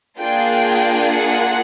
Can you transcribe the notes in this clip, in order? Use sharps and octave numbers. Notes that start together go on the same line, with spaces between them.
A#3 D4 F4 G#4 G5
F#5